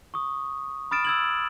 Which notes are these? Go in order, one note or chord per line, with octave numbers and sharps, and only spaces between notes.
C#6 D#6
B5 D#6 F6 A6 D7 E7
E6 G#6 F#7